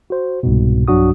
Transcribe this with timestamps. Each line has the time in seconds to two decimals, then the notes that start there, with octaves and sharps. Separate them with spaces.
0.10 F#4 C5
0.43 C2 G#2 B2
0.88 B1 G2 F#3 D4 F#4 D#6